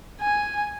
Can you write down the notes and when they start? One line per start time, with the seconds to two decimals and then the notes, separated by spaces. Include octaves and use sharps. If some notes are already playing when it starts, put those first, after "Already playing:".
0.21 G#5